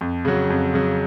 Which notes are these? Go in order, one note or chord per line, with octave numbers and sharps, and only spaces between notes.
F2
C#3 F#3
F2
C#3 F#3